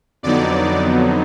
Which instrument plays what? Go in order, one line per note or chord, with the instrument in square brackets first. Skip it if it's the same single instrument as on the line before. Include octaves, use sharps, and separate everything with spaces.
[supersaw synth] F2 D3 F#3 B3 D#4 D5